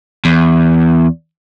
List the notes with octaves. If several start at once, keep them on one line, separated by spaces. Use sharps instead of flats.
E2